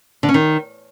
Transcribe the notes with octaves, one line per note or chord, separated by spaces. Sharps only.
D3
C#4
D#3